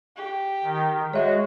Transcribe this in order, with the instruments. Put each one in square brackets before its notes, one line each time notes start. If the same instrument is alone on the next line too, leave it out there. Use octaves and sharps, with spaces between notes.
[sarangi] G4
[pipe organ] D#3
[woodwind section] G#3 [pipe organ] F#4 [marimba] C#5 E5